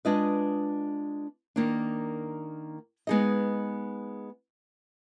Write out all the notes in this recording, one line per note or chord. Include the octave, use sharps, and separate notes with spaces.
G#3 D4 F4 B4 D#5
D#3 A#3 D4
G#3 B3 D#4 G#4 D#5